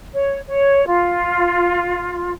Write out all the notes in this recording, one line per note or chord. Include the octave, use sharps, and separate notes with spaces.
C#5
C#5
F4